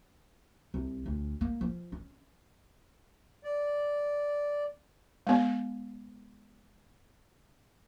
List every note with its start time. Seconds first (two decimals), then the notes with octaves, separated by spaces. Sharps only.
0.74 C2
1.06 D2
1.41 A#3
1.61 F3
1.92 C#4
3.44 D5
5.27 G#3 B3